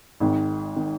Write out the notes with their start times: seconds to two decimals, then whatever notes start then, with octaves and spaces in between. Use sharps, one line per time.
0.20 G#1 G#2 D#3
0.76 D#3